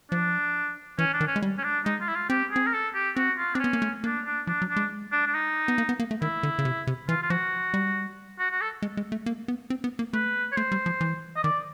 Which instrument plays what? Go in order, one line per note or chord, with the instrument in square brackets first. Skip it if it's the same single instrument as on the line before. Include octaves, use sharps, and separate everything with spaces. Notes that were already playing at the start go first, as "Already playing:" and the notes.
[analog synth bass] F3 [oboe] D4
[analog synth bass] E3 [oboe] C#4
[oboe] D4
[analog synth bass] D#3
[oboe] C#4
[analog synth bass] G#3
G3
[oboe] C#4
D4
[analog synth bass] G#3 [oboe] D#4
[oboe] F4
E4
F4
[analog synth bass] C4 [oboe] G4
[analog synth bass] C4 [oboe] G#4
[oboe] A#4
A4
G4
[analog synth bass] C4 [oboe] F#4
[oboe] F4
[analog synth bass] C4 [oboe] D4
[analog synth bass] B3 [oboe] C#4
[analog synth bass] A#3
A3
[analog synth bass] A#3 [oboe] D4
[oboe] D4
[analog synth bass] F3 [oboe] D4
[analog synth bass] F#3
[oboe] D4
[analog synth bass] G#3
[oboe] D4
D4
D#4
[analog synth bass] B3
A#3
B3
A#3
A3
[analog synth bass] D#3 [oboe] E4
[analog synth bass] D3
C#3
C3
C3
[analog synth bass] E3 [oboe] F4
[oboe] F4
[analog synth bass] F3 [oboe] F#4
[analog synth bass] G3
[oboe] F#4
F#4
A4
[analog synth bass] G#3
G#3
A3
A#3
B3
C4
B3
A#3
[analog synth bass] A3 [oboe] B4
[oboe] C#5
[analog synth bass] A3 [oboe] C5
[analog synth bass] G3
F3
E3
[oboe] D#5
[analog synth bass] D#3 [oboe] D5